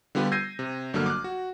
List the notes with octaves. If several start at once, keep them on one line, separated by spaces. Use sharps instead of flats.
D3 G3 B3 F4 G4 B4
E6 G6 G#6 A#6 C7 D#7
C3
G1 D3 F#3 A#3 A4 F6
D6 F6 F#6
F#4